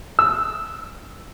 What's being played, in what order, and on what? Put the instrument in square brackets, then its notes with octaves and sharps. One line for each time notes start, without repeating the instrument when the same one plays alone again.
[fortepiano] E6